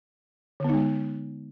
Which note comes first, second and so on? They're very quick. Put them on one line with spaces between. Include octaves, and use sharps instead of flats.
D3 B3 D#4 G#3